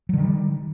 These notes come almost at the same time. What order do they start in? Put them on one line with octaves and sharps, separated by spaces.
F#3 D3 D#3 G3